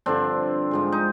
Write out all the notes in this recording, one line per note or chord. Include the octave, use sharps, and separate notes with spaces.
G2 D3 F3 C4 D4
G#2 F3 G#3
D#4